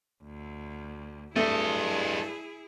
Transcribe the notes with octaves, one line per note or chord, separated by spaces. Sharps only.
D2
G2 A3 E4 G#4 A4 D#5